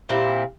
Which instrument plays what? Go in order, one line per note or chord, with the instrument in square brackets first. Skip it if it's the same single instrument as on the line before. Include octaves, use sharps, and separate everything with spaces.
[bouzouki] A#2 G3 C4 E4